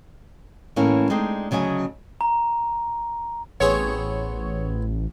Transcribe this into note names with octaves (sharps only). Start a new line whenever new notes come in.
A2 E3 A#3 C#4 E4
G#3 C4 D4 D#4
D2 C#3 F#3 D#5 G#5
A#5
A1 B3 C4 G#4 C#5